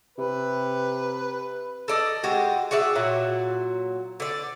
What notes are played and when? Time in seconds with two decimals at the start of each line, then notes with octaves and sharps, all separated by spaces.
0.18 C3 B4
1.88 A4 D5 D#5
2.23 G#3 F#4 G4
2.71 F#4 G#4 D5 E5
2.95 A#2 F#3 F#4
4.20 D3 D5